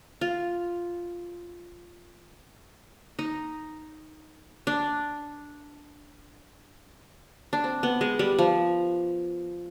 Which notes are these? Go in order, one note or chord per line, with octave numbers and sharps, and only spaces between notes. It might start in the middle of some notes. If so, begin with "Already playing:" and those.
F4
D#4
D4
D4
C4
B3
G#3
G3
F3